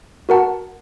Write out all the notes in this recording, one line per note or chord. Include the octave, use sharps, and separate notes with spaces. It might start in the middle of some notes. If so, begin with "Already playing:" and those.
F#4 A#4 F#5 A5